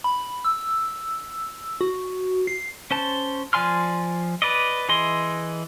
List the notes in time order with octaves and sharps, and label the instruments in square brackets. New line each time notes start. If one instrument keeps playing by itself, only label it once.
[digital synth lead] B5
E6
F#4
C7
[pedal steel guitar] C#4 C5 A5
F3 D5 G#5 C6 F6
B4 D5 D#5
E3 G#4 D#5 C6